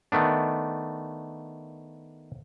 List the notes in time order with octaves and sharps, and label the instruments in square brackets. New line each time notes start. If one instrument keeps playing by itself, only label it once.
[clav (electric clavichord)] D#3 A3 B3 D4